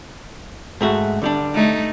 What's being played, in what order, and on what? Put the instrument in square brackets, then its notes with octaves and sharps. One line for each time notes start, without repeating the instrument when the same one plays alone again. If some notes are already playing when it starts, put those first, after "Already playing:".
[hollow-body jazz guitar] G#2 A3 F#4
D3 G3 D4
[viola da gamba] A3 D#4